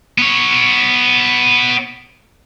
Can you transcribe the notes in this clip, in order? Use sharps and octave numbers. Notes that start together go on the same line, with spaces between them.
B3 C#5